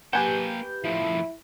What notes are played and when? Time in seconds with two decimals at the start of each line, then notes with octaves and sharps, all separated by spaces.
0.13 A#3 G4 B4 F#5 G#5 A5 G6
0.84 A2 F3 E4